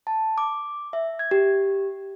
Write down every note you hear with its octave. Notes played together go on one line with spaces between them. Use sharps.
A5
D6
E5
G#6
G4